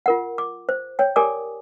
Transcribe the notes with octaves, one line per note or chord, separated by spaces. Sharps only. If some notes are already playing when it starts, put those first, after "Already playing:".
F4 A#4 F#5
D6
C5
C#5 G5
G4 A#4 D5 G#5 D6 D#6